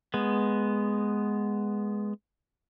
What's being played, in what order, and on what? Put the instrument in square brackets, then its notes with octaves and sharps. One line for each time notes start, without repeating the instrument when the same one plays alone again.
[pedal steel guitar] G#3 B3